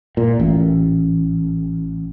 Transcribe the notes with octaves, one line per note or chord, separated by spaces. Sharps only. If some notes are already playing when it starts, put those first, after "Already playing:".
A#2
A1